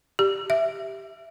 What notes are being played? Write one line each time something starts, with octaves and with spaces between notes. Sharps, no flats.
G4
E5